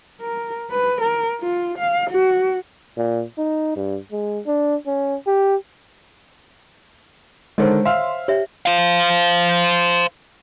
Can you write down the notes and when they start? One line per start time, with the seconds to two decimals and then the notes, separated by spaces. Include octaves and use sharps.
0.21 A#4
0.71 B4
1.01 A#4
1.41 F4
1.78 F5
2.10 F#4
2.97 A#2
3.38 D#4
3.77 G2
4.12 G#3
4.46 D4
4.87 C#4
5.27 G4
7.58 D3 D#3 G#3 C5 C#5 D#5
7.85 E5 F5 C6
8.28 G4 C#5 E5
8.66 C5 F5